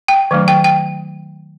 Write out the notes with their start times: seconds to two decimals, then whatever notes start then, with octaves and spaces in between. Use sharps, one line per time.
0.08 G5
0.31 D#3 F#3 A3 D4
0.48 G5
0.64 G5